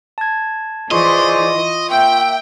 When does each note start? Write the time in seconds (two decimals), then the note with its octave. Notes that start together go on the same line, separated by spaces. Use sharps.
0.18 A5 G#6
0.91 E3 F4 G#4 C5 D5 D#5 C6 C#6
1.90 A#3 E5 G5